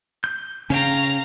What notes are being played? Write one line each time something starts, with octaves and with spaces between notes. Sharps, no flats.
G6
C#3 C#4 C#5 F5 G5 A#5